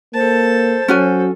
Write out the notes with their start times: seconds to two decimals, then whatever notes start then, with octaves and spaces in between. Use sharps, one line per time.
0.14 A#3 A4 C5 A5
0.88 F#3 C#4 F#4 A4 G#5